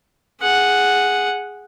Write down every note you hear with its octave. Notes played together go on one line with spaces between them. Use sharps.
G#4 F#5